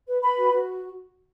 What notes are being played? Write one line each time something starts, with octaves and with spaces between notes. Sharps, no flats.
B4
B4 B5
F#4
F#4